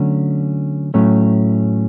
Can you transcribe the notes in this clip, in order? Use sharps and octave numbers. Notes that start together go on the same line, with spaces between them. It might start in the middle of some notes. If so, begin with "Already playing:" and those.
Already playing: D3 F#3 A3 C#4
A2 F#3 A3 C#4